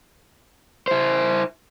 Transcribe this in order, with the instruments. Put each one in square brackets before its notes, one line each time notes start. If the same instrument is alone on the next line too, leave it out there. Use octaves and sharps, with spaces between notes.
[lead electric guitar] E4 C5